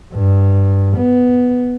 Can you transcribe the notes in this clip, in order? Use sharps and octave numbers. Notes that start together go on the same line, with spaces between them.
G2
B3